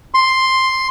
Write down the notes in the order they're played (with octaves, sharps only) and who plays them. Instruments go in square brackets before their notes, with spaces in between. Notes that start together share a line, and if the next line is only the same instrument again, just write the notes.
[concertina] C6